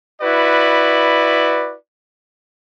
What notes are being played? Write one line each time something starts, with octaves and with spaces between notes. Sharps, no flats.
E4 F#4 B4 D5